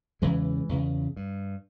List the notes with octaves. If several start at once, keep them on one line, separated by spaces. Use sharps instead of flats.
E2 C#3 E3 G#3
E2 C#3
G2